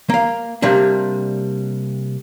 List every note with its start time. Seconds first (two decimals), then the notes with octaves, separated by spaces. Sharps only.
0.09 A#3 F5
0.62 C3 G3 A#3 D4